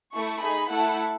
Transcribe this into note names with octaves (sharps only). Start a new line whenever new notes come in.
A3 E4 A4 C#6
D#4 G#4 B5
A3 E4 A4 F#5